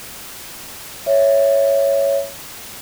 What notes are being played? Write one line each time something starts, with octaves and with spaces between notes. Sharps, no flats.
C#5 E5